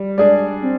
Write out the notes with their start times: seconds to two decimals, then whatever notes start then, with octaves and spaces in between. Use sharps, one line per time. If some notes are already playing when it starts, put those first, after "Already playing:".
Already playing: G3
0.17 G#3 D4 G#4 D5
0.62 C4